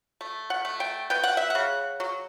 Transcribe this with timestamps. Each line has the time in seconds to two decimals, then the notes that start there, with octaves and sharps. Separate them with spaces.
0.21 A3
0.50 F#5
0.65 A3
0.80 G5
1.10 B3 G5
1.23 F#5
1.37 E5
1.50 C#3 F#5
2.00 F#3